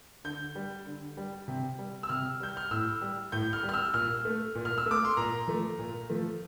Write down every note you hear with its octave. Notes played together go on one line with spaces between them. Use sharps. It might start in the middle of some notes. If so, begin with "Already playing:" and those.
D3 G6
G3
D3
G3
C3
G3
E6
C3 F6
G3 G6
F6
A2 E6
G3
A2 G6
F6
G3
F6
E6
A#2 F6
A3
A#2
F6
E6
A3 D6
C6
A#2 A#5
F3 A3
A#2
F3 A3